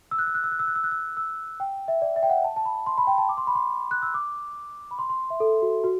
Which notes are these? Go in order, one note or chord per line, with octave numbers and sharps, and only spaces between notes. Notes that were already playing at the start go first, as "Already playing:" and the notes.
E6
F#6
E6
F#6
E6
F#6
E6
F#6
E6
F#6
E6
E6
G5
E5
D5
E5
G5
F#5
A5
A5
B5
C6
B5
G5
A5
D6
C6
B5
C6
F#6
E6
D6
B5
C6
C6
E5
A4
F#4
F#4